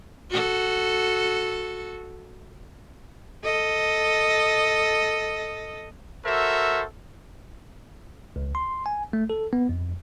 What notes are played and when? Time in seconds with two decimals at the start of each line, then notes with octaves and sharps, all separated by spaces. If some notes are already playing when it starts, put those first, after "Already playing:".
0.30 F#4 A4
3.44 A4 D#5
6.24 F#4 A4 A#4 C5 E5
8.36 C#2
8.55 C6
8.86 G#5
9.13 A3
9.30 A4
9.53 B3
9.69 F2